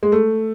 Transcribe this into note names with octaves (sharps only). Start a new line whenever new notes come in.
G#3
A3